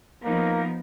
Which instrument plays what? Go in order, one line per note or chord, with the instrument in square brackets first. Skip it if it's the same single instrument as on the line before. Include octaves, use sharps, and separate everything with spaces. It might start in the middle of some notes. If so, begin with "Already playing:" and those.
[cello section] F3 B3 D#4 A#4 [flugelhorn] A#3